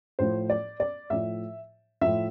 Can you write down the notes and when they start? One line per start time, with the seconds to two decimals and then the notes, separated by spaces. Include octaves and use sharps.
0.19 A2 F3 C5
0.50 D5
0.80 D5
1.10 A2 F3 E5
2.01 A2 F3 E5